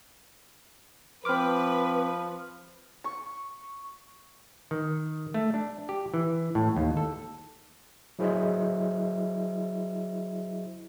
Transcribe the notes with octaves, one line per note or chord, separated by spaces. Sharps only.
F3 C4 B4 C6 D6 F6
C#6
D#3
A3
D4
G4
E3
A2
D#2
A4
F#3 E4 G#4 C5 D#5 E5